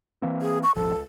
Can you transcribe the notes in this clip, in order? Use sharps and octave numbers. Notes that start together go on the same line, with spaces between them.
E3 A#3 C4
G#4
C#6
D#1 G#1 F3 A4
C#2